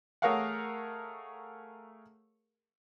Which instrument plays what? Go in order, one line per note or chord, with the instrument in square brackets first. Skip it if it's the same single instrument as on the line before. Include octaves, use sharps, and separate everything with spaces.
[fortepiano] A3 G#4 A#4 C#5 F5 F#5